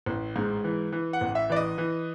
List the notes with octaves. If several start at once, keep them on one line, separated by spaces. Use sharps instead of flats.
A1
G#2
E3
E3
F#5
A1
E5
E3 D5
D#5
E3